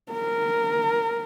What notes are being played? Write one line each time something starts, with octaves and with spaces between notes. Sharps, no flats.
A#4